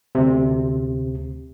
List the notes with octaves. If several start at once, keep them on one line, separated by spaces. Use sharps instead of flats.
D2 C3